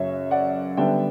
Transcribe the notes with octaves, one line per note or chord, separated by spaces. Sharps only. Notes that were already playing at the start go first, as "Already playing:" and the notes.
Already playing: F#2 C#3 F#3 C#5 E5
D5 F#5
D3 G3 B3 D4 E5 G5